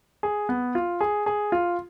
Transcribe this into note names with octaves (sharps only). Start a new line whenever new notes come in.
G#4
B3
F4
G#4
G#4
F4